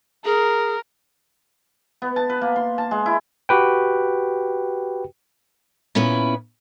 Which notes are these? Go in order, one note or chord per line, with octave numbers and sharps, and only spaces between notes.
G#4 A#4
B3
A5
B4
A#3
C6
A5
G#3
E4
F#4 G4 B4 G5
A#2 B3 C#4 E4 B4